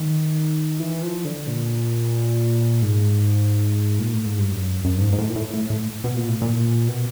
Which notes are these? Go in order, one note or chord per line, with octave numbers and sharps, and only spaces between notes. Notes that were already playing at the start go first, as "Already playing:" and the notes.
Already playing: D#3
E3
F3
D3
A#2
G#2
A#2
A2
G#2
G2
F#2
F#2
G2
G#2
G#2
A2
A#2
A2
A2
A2
B2
A#2
A2
A#2
B2